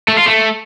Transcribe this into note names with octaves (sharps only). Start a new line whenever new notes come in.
A3
F4
A3